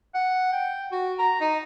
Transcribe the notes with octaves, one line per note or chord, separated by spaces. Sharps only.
F#5
G5
F#4
A#5
D#4